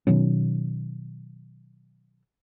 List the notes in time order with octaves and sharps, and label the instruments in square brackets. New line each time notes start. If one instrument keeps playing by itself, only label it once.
[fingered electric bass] B2 D#3 F#3 C#4